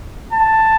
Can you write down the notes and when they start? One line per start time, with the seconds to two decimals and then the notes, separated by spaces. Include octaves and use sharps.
0.33 A5